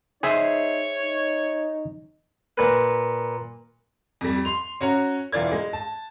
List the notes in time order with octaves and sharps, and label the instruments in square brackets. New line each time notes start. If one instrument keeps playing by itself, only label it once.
[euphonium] D#4 [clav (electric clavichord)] G#4 C5 E5 [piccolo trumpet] C#5
[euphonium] D#4
[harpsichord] A#2 B4
[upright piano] F2 G3
C6 F7
C#4 F#4 C#5 A#5
E1 E3 F4 D5 G#6
G#3
A5